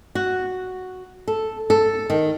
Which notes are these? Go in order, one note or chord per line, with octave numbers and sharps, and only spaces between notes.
F#4
A4
A4
D#3